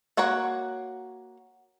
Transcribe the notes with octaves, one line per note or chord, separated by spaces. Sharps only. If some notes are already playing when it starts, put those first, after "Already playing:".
A#3 F#4 C#5 F#5 A#5